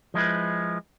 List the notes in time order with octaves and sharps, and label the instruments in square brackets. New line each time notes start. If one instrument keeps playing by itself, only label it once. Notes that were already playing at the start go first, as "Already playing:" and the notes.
[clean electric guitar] F3 G#3 E4 B4